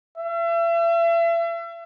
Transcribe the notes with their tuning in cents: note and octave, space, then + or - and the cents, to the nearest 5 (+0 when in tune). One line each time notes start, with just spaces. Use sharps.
E5 +40